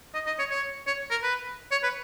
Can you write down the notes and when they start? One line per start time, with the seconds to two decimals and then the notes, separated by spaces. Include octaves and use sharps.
0.14 D#5
0.27 D#5
0.39 C#5
0.50 C#5
0.87 C#5
1.11 A#4
1.23 B4
1.71 C#5
1.83 B4